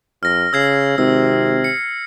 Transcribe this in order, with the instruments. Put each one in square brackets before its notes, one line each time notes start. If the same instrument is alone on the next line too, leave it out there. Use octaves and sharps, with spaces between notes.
[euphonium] F2 [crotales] F6 A#6
[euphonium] C#3 [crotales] E6 G#6 C7
[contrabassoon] G#1 [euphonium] C3 [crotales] E6
[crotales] C#7